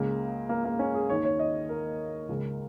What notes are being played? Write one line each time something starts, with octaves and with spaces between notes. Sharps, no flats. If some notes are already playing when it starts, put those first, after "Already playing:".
Already playing: C#2 C#3 A#3
A#3
A#3
C#4
G#4
D#2 D#3 C#5
C#5
D#5
A#4
C#2 C#3